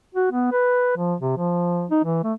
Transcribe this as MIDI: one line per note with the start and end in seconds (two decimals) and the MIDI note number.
0.15 0.28 66
0.31 0.48 59
0.52 0.96 71
0.96 1.15 53
1.20 1.35 48
1.37 1.86 53
1.91 2.01 63
2.03 2.22 52
2.24 2.33 57